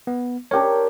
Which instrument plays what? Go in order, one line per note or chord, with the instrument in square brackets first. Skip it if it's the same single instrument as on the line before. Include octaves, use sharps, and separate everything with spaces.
[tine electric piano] B3
[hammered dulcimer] D4 G4 A#4 [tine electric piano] C#5